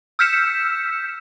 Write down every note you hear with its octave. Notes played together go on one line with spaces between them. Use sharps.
E6 F6 G6 B6 C#7 E7